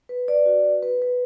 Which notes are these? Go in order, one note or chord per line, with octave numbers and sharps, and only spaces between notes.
B4
D5
F#4
B4
B4
B4